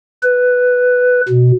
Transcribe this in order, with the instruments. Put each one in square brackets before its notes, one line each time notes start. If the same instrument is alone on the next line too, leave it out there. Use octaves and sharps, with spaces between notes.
[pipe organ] B4
B2